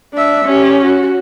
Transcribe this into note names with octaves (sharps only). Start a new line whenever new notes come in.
D4 E5
C#4 G4
F#4